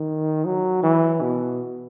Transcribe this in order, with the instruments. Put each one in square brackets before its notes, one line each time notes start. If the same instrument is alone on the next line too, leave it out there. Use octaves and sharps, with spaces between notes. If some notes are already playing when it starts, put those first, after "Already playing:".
Already playing: [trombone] D#3
F#3
E3
B2